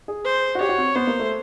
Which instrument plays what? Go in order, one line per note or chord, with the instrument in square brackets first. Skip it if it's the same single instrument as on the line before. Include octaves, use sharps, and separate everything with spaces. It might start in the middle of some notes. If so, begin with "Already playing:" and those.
[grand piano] G#4
[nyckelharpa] C5
[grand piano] F#4
[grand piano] G4 [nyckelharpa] C#5
[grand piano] F#4
C4
[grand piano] B3 [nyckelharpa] C5
[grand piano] A#3
A3